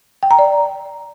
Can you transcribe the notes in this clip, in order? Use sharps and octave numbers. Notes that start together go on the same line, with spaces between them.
G5
A#5
D5